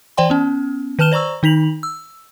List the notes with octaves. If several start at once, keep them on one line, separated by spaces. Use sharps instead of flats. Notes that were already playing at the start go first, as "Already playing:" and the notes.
E3 C5 D5 G5 C6
B3 C#4
D#3 B4 A5 F6 E7 G7
C5 D5 A#5 C#6 E6
D#3 D#4 B6 F7 F#7
E6